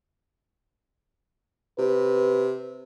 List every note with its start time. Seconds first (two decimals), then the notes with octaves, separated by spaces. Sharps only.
1.78 C3 B4